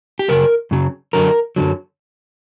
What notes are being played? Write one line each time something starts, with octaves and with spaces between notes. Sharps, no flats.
G4
F#2 C#3 F#3 A#4
F#2 C#3 F#3
F#2 D3 F#3 A#4
F#2 D3 F#3